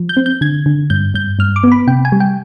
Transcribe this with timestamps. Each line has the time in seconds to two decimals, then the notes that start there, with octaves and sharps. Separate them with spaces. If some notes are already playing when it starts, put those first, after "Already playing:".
Already playing: F3
0.09 G6
0.17 C4
0.26 G6
0.41 D3 G#6
0.66 D3
0.90 G2 G6
1.14 G2 G6
1.39 G2 F6
1.56 D6
1.63 B3
1.72 B5
1.87 C3 G5
2.05 G#5
2.12 G3
2.20 G5